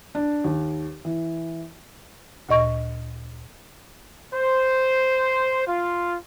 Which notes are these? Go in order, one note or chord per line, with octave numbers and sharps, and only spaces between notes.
D4
D#2
E3
D2 A#2 D#5 C#6
C5
F4